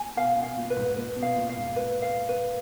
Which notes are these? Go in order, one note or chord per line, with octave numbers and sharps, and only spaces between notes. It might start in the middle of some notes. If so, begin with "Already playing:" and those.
Already playing: A#2 G#5
B2 F5
B2
F5
A#2
B4
G#2
A#2 B4
B2
F5
A#2
F5
G#2
B4
F5
B4